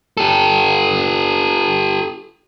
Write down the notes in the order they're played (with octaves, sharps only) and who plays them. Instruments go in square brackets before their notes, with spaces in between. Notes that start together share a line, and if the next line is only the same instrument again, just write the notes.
[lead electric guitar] G4 A4